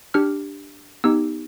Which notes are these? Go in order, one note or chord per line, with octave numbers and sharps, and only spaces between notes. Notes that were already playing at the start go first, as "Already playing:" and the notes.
D4 G4 F6
B3 D#4 G4 E6